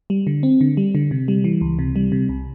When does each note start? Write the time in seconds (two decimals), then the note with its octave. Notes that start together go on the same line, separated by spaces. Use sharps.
0.10 G3
0.27 D3
0.43 C4
0.61 D3
0.77 G3
0.95 D3
1.11 C3
1.28 G3
1.44 E3
1.61 C#2
1.79 C3
1.96 G3
2.12 C3
2.29 C2